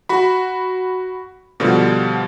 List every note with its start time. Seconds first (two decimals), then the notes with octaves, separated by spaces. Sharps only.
0.09 F#4 B5
1.60 B2 D3 F3 G3